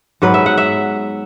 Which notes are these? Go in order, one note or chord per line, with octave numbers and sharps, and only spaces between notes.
G#2 F#3 B3 B4
E5
F#5
E5